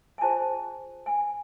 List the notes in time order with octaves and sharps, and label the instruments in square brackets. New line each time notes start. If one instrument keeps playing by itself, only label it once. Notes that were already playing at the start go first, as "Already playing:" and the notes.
[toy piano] G#5
F4 G#4 C5 A5
G#5